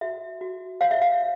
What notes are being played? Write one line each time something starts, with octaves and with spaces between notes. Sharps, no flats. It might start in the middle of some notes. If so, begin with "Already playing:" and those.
F#4 E5
F#4
C#5 F5
E5
F5